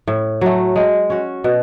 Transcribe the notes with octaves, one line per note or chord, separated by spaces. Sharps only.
A2
F#3 A3
G#3
C#4 F#4
B2